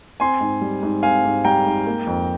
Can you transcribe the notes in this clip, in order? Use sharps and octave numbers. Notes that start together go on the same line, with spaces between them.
C4 G#5 C6
G#2
G3
G#2
C4 F5 G#5
G#2
G3 G5 A#5
G#2
A#3
F2